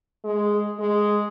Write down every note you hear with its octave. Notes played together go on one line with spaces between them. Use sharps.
G#3
G#3